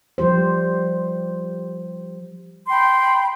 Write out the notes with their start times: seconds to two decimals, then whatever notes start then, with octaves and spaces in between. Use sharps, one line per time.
0.18 F3 G3 G4 C5
2.69 G5 B5 C6